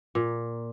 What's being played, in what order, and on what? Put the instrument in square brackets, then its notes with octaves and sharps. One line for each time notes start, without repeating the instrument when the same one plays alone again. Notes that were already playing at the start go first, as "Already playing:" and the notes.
[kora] A#2